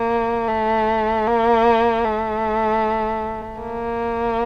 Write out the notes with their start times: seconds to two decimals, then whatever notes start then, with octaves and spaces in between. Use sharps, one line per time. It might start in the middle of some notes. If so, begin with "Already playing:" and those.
Already playing: A#3
0.48 A3
1.27 A#3
2.05 A3
3.61 A#3